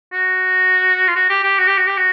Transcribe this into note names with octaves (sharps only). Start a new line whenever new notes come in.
F#4
F4
F#4
G4
G4
F#4
G4
F#4
G4
F#4